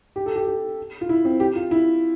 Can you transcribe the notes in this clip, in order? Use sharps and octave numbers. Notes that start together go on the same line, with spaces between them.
G4
A4
G4
G4
F4
E4
C4
G4
F4
E4